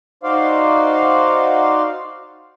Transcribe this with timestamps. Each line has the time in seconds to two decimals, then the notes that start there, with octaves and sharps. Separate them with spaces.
0.23 D#4 F#4 C5 D5 F5